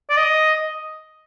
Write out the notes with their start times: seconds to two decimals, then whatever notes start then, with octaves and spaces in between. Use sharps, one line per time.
0.10 D5
0.17 D#5